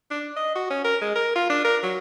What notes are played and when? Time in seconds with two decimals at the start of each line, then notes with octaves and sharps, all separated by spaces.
0.11 D4
0.36 D#5
0.55 F#4
0.70 C#4
0.84 A#4
1.02 G#3
1.15 A#4
1.36 F4
1.50 D4
1.65 A#4
1.83 F#3